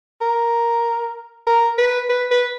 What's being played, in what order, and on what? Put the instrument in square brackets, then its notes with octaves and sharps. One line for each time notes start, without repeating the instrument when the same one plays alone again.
[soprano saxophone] A#4
A#4
B4
B4
B4